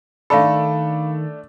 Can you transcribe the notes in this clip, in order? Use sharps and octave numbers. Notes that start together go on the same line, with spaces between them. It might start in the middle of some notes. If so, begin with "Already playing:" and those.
D#3 A3 D4 A4 F5 B5